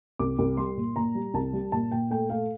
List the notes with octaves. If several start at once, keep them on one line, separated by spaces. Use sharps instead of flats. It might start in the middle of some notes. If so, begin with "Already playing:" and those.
C2 D6
C2
G3 C6
A#2
A#2 A#5
G3
C2 A5
G3
A#2 A5
A#2 G5
A3 G5
A3 F5